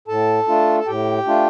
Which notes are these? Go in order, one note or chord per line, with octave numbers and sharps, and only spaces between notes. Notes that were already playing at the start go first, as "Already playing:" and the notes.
A2 A4 A5
A3 D4 F4
A5
A2 G4 G5
A3 D4 F4